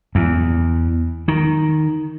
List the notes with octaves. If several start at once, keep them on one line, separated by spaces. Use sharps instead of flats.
E2
D#3